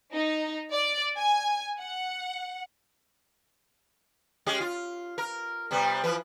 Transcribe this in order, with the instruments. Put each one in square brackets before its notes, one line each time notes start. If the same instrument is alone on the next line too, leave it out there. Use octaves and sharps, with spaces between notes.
[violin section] D#4
D5
G#5
F#5
[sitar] G#3 C#4 G4
F4
A#4
C3 G3 B3
E3 F3 B4